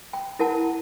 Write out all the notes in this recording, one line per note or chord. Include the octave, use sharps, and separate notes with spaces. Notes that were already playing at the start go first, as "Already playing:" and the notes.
G5
E4 A#4 F#5 A5